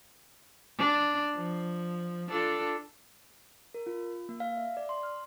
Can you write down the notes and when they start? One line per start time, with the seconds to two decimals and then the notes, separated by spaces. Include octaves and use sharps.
0.78 D4
1.36 F3
2.30 D4 F4 A4
3.74 A#4
3.86 F4
4.29 A#3
4.40 F5
4.57 E5
4.77 D5
4.89 C6
5.03 F6